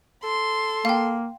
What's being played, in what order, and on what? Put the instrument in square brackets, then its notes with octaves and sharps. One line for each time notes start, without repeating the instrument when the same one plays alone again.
[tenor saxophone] A4 [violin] C6
[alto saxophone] A#3 [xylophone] F5 G5